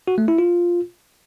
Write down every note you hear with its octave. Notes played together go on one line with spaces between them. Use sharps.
F#4
A3
E4
F4